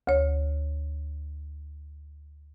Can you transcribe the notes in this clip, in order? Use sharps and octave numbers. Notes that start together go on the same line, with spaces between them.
D2 C#5